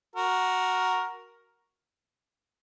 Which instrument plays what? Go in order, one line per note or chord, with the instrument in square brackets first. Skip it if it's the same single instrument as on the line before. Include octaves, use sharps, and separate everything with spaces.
[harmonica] F#4 A#4